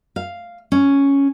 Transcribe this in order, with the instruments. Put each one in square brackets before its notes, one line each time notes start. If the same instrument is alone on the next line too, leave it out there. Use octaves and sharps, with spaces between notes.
[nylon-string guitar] F5
C#4